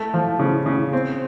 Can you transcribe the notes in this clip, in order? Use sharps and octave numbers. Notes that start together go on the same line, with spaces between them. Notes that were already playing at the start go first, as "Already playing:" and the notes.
Already playing: A3
F3
C#3
C#3
C4